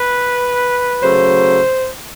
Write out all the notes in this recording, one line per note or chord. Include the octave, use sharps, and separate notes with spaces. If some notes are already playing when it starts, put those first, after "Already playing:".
Already playing: B4
C#3 F#3 A3 C5